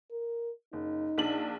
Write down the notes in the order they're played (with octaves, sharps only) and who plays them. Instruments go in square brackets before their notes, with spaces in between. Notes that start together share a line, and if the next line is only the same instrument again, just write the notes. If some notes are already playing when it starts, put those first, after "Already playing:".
[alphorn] A#4
[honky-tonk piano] F#1 [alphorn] D#4
[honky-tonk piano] A#1 D4 F#7